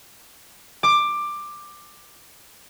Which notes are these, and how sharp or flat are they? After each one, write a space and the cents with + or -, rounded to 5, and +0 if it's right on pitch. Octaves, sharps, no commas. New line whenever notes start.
D6 +15